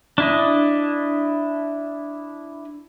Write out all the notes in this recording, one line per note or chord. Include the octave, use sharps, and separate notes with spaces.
D4 E4 D#5